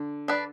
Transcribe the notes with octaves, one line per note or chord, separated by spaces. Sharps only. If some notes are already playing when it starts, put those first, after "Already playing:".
Already playing: D3
D4 B4 D5